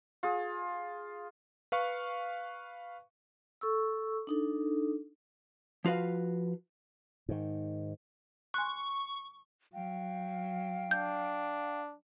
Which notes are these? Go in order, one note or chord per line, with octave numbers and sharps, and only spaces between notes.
F4 G#4
B4 F5 C#6
A4 C#6 E6
D4 D#4 A4
F3 F4 F#4 B4 F5
G#2 D#3
G#5 C6 C#6 F#6
F#3 F5 G5
D4 G6